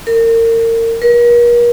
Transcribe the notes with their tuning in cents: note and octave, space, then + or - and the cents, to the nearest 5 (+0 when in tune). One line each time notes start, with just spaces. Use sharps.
A#4 -30
A#4 +40